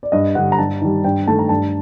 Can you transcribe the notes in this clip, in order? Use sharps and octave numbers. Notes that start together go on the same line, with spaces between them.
D5
G2 D#5
D3 G3 F#5
A#5
G2 A5
D#3 G3
G2 G5
D#3 A3 A5
A#5
G2 A5